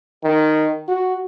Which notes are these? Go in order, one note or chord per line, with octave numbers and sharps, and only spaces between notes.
D#3
F#4